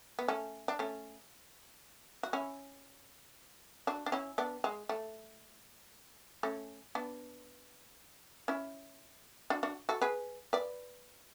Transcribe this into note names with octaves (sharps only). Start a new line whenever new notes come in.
B3
A3 C#4
D4
A3 C#4
F#4
C#4 E4
D4 F#4
D4
C#4 E4
B3 D4
G#3
A3
A3 C#4
B3 D4
C#4 E4
D4 F#4
D4 F#4
F#4 A4
G#4 B4
B4 D5